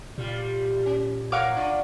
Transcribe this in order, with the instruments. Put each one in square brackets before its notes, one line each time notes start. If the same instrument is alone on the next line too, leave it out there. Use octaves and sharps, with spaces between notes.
[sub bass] A#2 [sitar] G3 F4
[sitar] C#4
[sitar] A#4 C#5 [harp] F5 F#5 D6
[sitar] D4 F4 D5